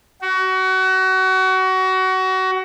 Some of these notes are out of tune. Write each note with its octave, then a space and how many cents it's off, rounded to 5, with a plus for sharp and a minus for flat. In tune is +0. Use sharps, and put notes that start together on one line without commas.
F#4 +25